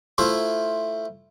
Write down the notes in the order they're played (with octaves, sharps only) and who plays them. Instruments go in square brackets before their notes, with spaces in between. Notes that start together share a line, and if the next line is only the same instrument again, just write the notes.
[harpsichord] A3 E4 F4 C5